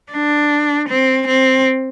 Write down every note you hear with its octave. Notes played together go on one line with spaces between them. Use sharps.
D4
C4
C4